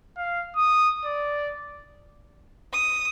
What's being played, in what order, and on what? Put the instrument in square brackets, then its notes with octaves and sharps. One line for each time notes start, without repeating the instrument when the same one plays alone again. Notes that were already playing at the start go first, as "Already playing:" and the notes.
[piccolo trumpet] F5
D#6
D5
[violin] D#6